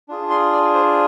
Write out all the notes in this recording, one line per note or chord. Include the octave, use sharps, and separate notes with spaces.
D4 F4 G#4
C6
D5
C5